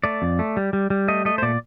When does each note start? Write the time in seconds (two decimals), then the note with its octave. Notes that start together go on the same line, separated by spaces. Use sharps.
0.04 A3 D5
0.22 F2
0.39 A3
0.57 G3
0.73 G3
0.90 G3
1.08 A3 D#5
1.25 A3 D#5
1.38 C5
1.42 A#2 D5